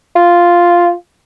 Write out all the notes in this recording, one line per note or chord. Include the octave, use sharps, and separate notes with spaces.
F4